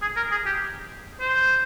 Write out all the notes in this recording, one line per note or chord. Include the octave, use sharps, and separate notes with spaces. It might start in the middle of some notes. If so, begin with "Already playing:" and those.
G#4
A#4
G#4
G4
C5